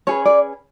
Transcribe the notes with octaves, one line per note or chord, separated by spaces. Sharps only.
C#4 G#4 B4 C#5
D5